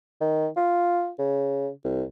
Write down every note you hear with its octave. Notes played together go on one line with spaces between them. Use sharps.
D#3
F4
C#3
C2